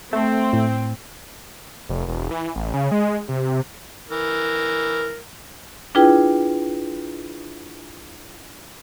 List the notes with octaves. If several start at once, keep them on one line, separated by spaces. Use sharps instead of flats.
A3 C4
A2
F1
E1
E3
A1
C#3
G#3
C3
E3 A#4
D4 E4 F4 G#4 B4 G5